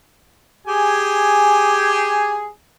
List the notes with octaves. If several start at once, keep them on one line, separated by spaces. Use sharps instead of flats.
G4 G#4 G#5